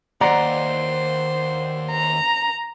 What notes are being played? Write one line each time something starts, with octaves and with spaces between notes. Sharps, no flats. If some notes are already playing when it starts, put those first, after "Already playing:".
D#2 C5 D5 F#5 A#5 C6
A#5